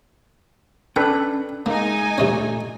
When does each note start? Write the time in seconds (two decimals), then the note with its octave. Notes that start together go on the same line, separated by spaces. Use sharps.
0.96 C#4 D4 A4 B4 G5
1.66 G#3 A#3 D#4 E5 G#5
2.18 G2 A#2 E3 A3 C#4